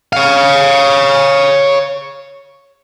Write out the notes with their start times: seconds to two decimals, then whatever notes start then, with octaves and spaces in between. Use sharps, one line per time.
0.13 C#5 F5